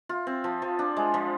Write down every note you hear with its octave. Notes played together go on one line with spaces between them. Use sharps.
F4
C4
F3
F3
D4
G#3
F3